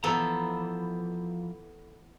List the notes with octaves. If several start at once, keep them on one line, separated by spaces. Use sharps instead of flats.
E3 F3 B3 A4 C5 A#5